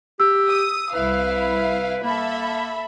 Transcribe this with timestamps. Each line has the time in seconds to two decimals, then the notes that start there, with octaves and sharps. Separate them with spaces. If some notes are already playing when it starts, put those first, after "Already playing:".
0.20 G4 E6
0.48 D#6
0.93 C2 E4 B4 F5
2.03 A#3 A4 E5 B5